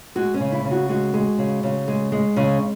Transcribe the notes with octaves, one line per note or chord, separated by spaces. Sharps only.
G#3 F#4
C#4
C#3
E4
C#3
F#4
G#3 F#4
G#3
C#3
C#3
G#3
G#3
C#3 C#4